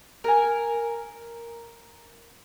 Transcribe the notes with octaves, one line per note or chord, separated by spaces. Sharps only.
A#4 G#5